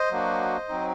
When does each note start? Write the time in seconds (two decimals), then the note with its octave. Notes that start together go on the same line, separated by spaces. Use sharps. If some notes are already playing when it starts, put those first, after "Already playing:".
Already playing: C5 D#5
0.11 F#3 A#3 D4 F#4
0.69 F#3 C4 D#4